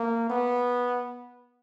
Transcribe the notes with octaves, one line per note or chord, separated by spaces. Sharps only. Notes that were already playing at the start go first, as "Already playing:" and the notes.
Already playing: A#3
B3